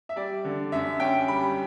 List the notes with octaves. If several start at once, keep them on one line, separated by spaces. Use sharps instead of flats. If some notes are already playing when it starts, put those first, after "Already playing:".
E5
G3 D5
D3
F#2 E5
C#4 G5
G3 B5